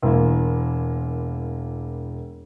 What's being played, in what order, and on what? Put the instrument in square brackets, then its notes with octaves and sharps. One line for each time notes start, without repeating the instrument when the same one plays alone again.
[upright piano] E1 E3 A#3